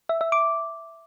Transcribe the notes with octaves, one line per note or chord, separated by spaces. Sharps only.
E5
E5
D6